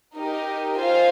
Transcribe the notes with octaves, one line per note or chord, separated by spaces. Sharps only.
D#4 G4 A#4 D#5
F4 C5 F5 G#5